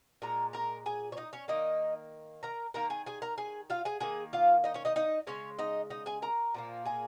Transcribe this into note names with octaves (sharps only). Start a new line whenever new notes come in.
A#2 G#3 A#4 A#5
A#4 A#5
G#4 G#5
C#5
D#4 D#5
C#4 C#5
D#3 A#3 D#4 D#5
A#4 A#5
D#3 A#3 A#4 A#5
G#4 G#5
G#4 G#5
A#4 A#5
G#4 G#5
F4 F5
G#4 G#5
D#3 A#3 G#4 G#5
F4 F5
D#4 D#5
C#4 C#5
D#4 D#5
D#4 D#5
C#3 G#3 C#4 C#5
D#4 D#5
D#4 D#5
G#4 G#5
A#4 A#5
A#2 F3 A#3
G#4 G#5